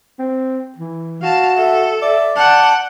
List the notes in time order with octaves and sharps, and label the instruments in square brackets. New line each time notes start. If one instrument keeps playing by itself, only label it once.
[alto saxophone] C4
E3
[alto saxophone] F#4 [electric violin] F5 A5
[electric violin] A4 [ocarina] E5
[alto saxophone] D5 [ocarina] E5
[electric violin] F#5 G5 [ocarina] A5